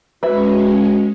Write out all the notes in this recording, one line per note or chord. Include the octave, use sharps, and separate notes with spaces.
G#3 C#4 F#4 B4 E5